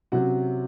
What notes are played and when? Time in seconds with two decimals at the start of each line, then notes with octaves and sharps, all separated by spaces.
0.12 C3 F#3 C#4 F#4